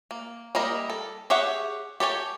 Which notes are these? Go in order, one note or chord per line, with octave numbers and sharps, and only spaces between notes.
A#3
G3 A#3 E4 A#4 D#5
A4
G4 G#4 C#5 E5 F#5
G4 A4 C#5 G#5